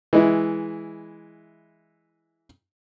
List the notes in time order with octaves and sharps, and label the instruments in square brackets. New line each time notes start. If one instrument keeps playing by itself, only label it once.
[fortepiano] E3 G#3 E4